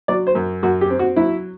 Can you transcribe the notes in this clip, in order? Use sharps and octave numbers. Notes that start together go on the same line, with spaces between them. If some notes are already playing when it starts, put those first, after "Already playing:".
F#3 D5
C5
F#2
F#2 F#4
G4
C4
F#4
F#3 E4